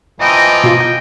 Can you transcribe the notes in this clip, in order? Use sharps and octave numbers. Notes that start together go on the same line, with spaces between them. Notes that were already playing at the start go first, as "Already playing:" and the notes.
E3 F3 A#3 D#5 G5
B2 F4